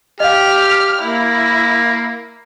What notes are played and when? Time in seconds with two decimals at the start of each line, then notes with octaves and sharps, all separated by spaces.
0.20 G4 D#5 F5 F6
1.02 A#3 E4